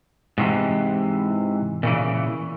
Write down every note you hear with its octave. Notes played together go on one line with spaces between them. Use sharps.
G#2 C3 E3
A#2 C#3 E3